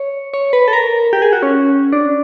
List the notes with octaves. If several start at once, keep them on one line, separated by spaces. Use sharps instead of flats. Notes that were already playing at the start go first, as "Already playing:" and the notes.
Already playing: C#5
C#5
B4
A4
A#4
G4
G#4
F#4
C#4
D4